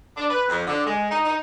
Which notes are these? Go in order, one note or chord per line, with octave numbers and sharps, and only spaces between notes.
D4
B4
F2
D3
G#3
D#4
D#4